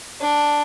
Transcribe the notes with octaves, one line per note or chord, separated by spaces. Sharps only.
D4